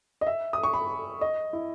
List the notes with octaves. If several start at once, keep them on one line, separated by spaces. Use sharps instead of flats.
D#5
E5
D#6
C#6
B5
D#5
E4